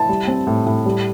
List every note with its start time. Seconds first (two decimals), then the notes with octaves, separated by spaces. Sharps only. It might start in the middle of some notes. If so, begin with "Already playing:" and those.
Already playing: E4 A5
0.09 G3
0.28 C4
0.47 A2
0.66 A2
0.86 G3